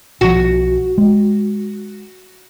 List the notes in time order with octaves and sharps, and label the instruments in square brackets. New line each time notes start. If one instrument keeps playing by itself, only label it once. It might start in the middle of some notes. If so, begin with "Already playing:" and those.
[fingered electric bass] B1 F3 [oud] F#4
[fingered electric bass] G#3